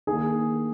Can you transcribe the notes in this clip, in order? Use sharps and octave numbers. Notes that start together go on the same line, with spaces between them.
D#3 A#3 D#4 G#4 G#5